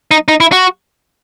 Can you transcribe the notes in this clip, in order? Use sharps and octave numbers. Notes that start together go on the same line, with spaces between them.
D#4
D#4
E4
F#4